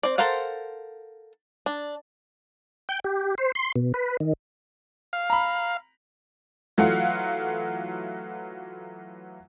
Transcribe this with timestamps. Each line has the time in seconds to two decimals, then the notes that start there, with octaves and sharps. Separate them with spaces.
0.03 C4 D5
0.18 A4 A#4 C5 F5 F#5
1.66 D4
2.89 G5
3.04 G4
3.38 C5
3.55 C6
3.76 B2
3.94 B4
4.20 D#3
5.13 F5
5.30 A#5 B5
6.78 E3 F#3 A3 F4 F5 F#5